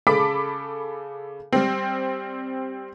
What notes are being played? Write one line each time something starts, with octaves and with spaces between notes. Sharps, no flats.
C#3 A4 A5 B5 D6 B6
G3 C4